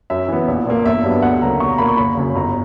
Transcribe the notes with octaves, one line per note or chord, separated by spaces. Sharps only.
F#2 E5
E3 B3
A#1
A#2 A#3
G1 E5
G2 F#3 B3
D2 F#5
C#3 F#3 A#3 A#5
B1 C#6
A#5
A#2 A#3 B5
C#6
F#1 B5
F#2 C#3
G1 A#5